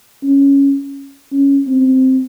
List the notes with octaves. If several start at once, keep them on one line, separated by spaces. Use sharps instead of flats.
C#4
C#4
C4